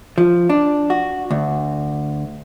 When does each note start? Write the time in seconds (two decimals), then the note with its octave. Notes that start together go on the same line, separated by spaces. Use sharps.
0.18 F3
0.50 D4
0.90 F#4
1.31 D2